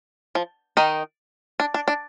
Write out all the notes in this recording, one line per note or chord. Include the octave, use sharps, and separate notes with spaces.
F3
D#3 D#4
D4
D4
D4